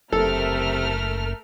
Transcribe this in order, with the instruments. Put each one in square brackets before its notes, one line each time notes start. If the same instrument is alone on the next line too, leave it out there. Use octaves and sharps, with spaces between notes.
[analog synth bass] F#1 [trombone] C3 [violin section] A3 A#4 F6 [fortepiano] A4